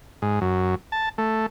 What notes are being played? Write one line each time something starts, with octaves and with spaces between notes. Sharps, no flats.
G#2
F#2
A5
A3